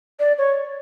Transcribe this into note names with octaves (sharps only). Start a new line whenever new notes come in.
D5
C#5